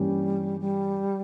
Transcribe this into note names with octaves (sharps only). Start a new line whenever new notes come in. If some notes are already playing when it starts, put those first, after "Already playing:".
Already playing: G2 E3 G3 A#3 C#4 G4
G3